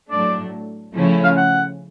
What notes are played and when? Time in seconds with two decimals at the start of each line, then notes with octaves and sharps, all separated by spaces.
0.11 A2 F#3 A3 D4 D5
0.95 C#3 F3 A3 C#4 E4
1.24 F5
1.37 F#5